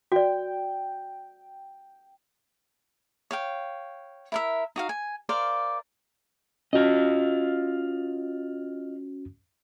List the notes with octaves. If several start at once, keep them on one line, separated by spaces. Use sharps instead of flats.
F#4 D5 G5
C#5 F5 G5
E4 A#4 E5
D#4 F#4 F5
G#5
A#4 C5 D5 F5
C#4 F4 F#4 D#5